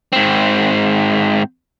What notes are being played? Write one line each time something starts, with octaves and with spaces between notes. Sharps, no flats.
G#2 C4